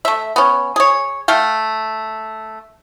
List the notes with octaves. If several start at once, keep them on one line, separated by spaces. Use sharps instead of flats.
A3 E5
B3 C#4
G#4 C#5
A3 F5 G5